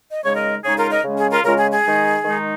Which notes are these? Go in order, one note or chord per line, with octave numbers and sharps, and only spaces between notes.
D#5
C#3 G#3 D#4 C#5
A#4 D#5
C#3 G#3 D#4 G#4 C#5
F4 A#4
A#4 D#5
C#3 G#3 C#4
G#4
F4 A#4
C#3 G#3 C#4 F4 A#4
G#4
G#4
D#3 G#3 D#4
D#3 G#3 D#4